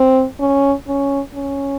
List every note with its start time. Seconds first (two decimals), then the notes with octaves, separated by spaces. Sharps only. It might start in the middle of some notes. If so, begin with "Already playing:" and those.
Already playing: C4
0.40 C#4
0.88 C#4
1.35 C#4